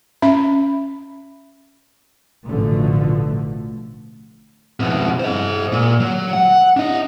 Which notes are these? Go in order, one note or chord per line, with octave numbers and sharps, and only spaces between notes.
C#4 E5 B5
A1 B2 D3 F3 A3
F2 B2
C5 D#5
A#2
F#3
F#5
D4 D#5